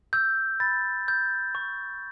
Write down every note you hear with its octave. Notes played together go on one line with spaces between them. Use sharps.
E6 G6
B5 A6
E6 G6
C#6